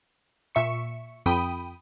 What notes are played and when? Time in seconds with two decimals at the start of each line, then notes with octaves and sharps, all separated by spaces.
0.55 A#2 E5 C#6 C#7
1.26 F2 G5 B5 D#6 D#7